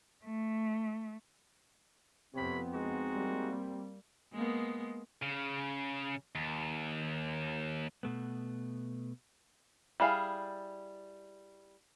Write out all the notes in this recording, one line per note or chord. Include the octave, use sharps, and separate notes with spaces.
A3
F2 C3 B3 C4 C#5 B5
G#3 D#4 F#4
G3 A#3
G#3 A#3 B3
C#3
D#2
B2 A3 B3
G3 E4 G#4 F5